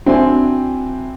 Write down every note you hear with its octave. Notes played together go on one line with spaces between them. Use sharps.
C4 D4 E4 F#4 G5 G#5